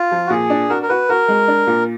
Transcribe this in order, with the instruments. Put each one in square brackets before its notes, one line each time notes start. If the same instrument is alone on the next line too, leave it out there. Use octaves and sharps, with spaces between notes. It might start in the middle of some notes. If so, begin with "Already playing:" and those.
Already playing: [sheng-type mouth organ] F4
[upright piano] F3
[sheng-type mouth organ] F#4
[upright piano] A#2 [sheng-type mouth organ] G#4
[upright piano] D4
[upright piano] F#4 [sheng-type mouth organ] A#4
[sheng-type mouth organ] A#4
[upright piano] F#4 [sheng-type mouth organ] B4
[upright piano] F#4 [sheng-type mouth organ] A#4
[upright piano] G#3
D4
A#2